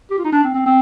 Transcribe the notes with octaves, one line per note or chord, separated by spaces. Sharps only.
G4
F4
D#4
D4
C4
C4
C4